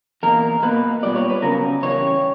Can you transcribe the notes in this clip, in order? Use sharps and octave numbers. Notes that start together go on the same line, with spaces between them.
E2 B2 A#3 A#4
B2 A#3 B4
A#2 G3 B3 D5
C#5
B4
C#3 F#3 B3 A#4
C#3 E3 G3 C#5